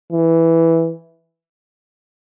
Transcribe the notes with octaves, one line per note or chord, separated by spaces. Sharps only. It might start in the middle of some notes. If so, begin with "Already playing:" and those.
E3